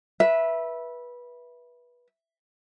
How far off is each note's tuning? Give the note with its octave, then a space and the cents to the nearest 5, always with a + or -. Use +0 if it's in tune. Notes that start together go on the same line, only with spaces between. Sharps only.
B4 -20 E5 +0